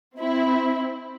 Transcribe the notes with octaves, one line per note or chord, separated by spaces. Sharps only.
C4 E4